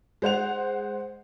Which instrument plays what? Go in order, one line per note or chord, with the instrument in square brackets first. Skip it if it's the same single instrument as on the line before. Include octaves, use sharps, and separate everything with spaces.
[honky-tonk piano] G#3 C5 F#5 F7